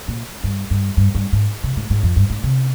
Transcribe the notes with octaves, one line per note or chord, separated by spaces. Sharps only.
A#2
G2
G2
G2
G2
G#2
C3
G#2
G#2
F2
G2
G#2
C3